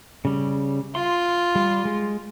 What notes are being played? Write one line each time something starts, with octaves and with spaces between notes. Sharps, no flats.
C#3 G3
F4 C6
G3
G#3